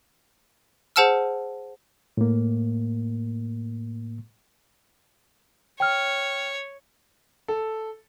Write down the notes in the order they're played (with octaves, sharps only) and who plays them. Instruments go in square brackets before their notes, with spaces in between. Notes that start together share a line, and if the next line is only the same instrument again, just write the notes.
[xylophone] G#4 C5 F#5 A5 E6 F6
[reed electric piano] A2 A#3
[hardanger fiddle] C#5 [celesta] G5 F6
[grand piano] A4